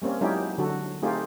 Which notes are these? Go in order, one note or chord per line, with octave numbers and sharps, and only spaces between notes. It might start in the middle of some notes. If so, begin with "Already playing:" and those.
G3 A#3 C4 C#4
F#3 G#3 C#4 D#4 E4 G4
D3 F#3 F#4 A4
A3 C4 D#4 F4 G4 G#4